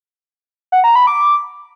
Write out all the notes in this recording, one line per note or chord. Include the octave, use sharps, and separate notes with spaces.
F#5
A#5
B5
D6